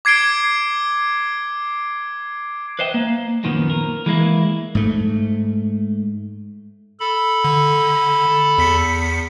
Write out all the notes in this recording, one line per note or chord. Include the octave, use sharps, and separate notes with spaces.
D6 G#6 C7 D7 G7
B4 C5 D#5 E5 G5
A#3
F#2 A#2 D#3 F3 B3
A#4
E3 G#3 A#3 E4
G#2 A3
A4 B5
D3
E2 B6 C#7